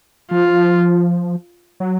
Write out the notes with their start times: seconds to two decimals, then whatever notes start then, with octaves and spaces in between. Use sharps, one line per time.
0.31 F3 F4
1.80 F#3